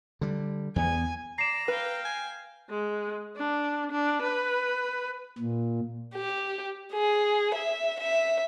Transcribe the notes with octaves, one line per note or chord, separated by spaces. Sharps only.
D3 G3
E2 B3 G#5
D5 A#5 C7 E7
B4 F5 G5
G#5
G#3
D4
D4
B4
A#2
G4
G#4
E5
E5